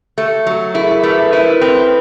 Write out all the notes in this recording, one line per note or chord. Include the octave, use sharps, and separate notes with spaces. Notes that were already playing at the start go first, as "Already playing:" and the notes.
A3 G4
F#3
E4 G#4 A#4
A3 A4 B4
B4
E4 A#4 C5
C4 A4 B4